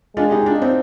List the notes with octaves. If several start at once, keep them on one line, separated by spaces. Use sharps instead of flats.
G#3 D4 F4
D#4 G4
D4 F4
C4 D#4